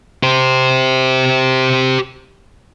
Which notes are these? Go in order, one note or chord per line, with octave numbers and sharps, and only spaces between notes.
G4 C5